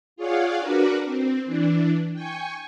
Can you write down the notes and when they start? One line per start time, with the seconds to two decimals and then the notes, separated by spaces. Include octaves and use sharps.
0.16 F4 G#4 C#5 D5 F5 F#5
0.59 D4 F#4 A#4 B4 D6
1.05 C4
1.46 E3 D4
2.13 G5 G#5 C#6